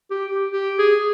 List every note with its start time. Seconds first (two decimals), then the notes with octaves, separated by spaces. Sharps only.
0.11 G4
0.31 G4
0.52 G4
0.79 G#4